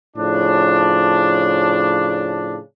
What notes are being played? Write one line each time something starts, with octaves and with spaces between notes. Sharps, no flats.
A2 C#3 F3 D4